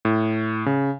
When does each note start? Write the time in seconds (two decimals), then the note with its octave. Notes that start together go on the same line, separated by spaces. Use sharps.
0.05 A2
0.66 C#3